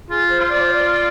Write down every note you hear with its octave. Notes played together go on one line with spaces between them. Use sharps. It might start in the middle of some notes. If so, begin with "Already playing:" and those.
F4 G#4
C5
F4
D5
C5
D5